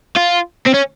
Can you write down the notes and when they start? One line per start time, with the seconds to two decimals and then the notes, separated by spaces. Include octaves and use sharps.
0.17 F4
0.67 C4
0.74 C#4